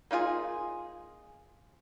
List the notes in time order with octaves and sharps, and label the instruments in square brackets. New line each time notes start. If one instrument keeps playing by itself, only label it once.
[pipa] A#3 D#4 F4 G#4